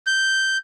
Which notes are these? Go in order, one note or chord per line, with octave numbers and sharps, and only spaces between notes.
G6